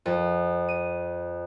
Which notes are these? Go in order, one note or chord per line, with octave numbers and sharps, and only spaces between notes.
F2
D#7